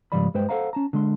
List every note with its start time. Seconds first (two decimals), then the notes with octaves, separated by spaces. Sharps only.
0.12 C#2 G#2 F3 G3 D5 B5
0.34 G2 G#3 B4 C5 G5
0.49 A4 A#4 C5 F5 F#5 A#5
0.73 C#4 A5 A#5
0.93 D3 G#3 C6